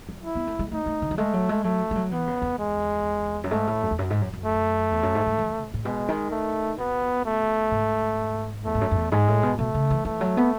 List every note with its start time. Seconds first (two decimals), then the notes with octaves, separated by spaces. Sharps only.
0.09 F#3
0.24 E4
0.35 B3
0.47 A3
0.59 G#3
0.72 A3 D#4
0.86 A3
1.02 D#3
1.11 F#3
1.18 G#3 A3
1.33 F#3
1.49 G#3
1.64 F#3 A3
1.91 G#3
1.96 F#3
2.12 E3 B3
2.27 C#3
2.42 E2
2.58 G#3
3.44 F#2
3.51 G#2 A3
3.67 A2
3.83 F#2
3.91 E2
3.99 F#2
4.10 G#2
4.21 F#2
4.33 F#2
4.45 A3
4.92 E2
5.03 F#2
5.15 G#2
5.26 G#2
5.38 E3
5.50 E3
5.62 A2
5.74 A2
5.84 B2 G#3
6.09 D#3
6.31 A3
6.78 B2 B3
7.25 A3
7.71 G#2
8.65 E2 A3
8.75 G#2
8.81 F#2
8.91 F#2
8.96 E2
9.12 G#2 G#3
9.28 A2
9.43 B2
9.59 B2 A3
9.74 C#3
9.90 E3
10.05 E3 A3
10.21 F#3
10.37 B3